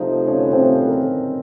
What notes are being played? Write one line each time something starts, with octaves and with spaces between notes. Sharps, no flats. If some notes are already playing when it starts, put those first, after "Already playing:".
Already playing: C3 F3 A3 D#4 D#5
C#4 C#5
B4
C4 C5
B4
A#4